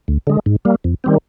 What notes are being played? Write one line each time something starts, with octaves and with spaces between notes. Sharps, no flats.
D2
D3 G#3
G#2
G3 A#3
F2
D#3 G3 C4